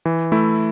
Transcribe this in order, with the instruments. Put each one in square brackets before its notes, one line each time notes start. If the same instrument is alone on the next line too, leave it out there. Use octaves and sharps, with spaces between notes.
[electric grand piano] E3
A3 E4